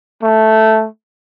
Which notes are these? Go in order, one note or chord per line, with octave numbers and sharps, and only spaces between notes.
A3